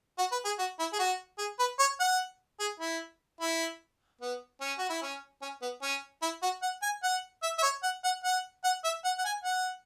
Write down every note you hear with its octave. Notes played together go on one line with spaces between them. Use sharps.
F#4
B4
G#4
F#4
E4
G#4
F#4
G#4
B4
C#5
F#5
G#4
E4
E4
B3
C#4
F#4
E4
C#4
C#4
B3
C#4
E4
F#4
F#5
G#5
F#5
E5
E5
C#5
F#5
F#5
F#5
F#5
E5
F#5
F#5
G#5
F#5